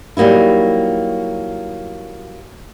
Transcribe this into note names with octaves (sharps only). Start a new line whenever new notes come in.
F#3 G3 A#3 D#4 E4